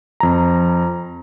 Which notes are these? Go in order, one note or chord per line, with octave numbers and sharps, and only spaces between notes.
F2 A#5